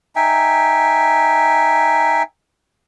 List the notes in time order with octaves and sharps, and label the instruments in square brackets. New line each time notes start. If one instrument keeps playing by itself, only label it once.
[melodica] D#4 E5 G5 G#5